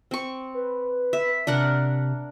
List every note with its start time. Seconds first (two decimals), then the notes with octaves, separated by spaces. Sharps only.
0.11 C4 C#6
0.54 B4
1.13 E5
1.47 C3 D4 A#4 F#5